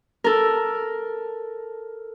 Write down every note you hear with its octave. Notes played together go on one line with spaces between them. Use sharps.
A4 A#4